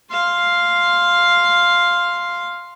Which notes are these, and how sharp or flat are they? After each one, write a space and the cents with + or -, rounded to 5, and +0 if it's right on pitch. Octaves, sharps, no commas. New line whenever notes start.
F5 +0 C6 +0